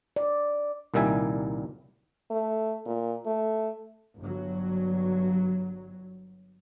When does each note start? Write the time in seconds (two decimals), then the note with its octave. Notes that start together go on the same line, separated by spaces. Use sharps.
0.16 D5
0.94 C2 A#2 D#3 G3 E5 G#5
2.30 A3
2.86 A#2
3.26 A3
4.19 G1 F#3